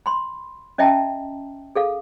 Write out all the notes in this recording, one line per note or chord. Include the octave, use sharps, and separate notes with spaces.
B5 C6
C#4 D#5 E5 G5 A5 A#5
G#4 A4 F5